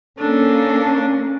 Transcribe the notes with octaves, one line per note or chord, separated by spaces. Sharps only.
A#3 C#4 D4 A4